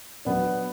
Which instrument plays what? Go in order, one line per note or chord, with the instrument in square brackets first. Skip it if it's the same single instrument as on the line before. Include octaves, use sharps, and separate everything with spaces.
[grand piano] F#3 B3 D4